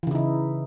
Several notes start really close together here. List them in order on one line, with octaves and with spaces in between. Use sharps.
E3 C#3 E4 D#4